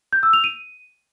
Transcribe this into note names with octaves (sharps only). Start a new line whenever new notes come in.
G6
E6
F7
D#7